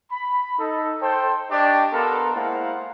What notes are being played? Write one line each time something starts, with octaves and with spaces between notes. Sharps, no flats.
B5
D#4 A4
A4 C5 G5
D4 G4 D5 D#5 A5 C#6
B3 A4 A#4 F5 A#5 C6
G#3 A#3 E4 C5 F5 F#5